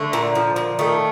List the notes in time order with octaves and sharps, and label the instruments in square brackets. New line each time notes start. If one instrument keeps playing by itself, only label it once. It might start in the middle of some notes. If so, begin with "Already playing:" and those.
Already playing: [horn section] D3 [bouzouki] A3
[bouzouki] A#2
F3
A#2
[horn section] D#3 [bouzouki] A3